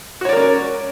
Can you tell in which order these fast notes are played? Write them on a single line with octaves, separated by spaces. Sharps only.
F#4 C#5 D5 A#4 C#4